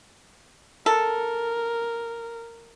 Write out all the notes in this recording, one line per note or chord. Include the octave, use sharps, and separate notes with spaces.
A4 A#4